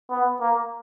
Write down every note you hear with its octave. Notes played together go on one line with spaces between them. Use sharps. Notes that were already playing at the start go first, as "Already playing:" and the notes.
B3
A#3